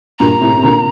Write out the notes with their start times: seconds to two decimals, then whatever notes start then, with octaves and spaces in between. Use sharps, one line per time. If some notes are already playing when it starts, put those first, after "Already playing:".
0.19 G2 A#2 A#5
0.41 A2 C3
0.57 C3
0.63 A#2 D3